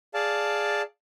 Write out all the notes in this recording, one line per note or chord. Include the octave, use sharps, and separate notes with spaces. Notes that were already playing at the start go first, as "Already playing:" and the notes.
G#4 D5 F5 A5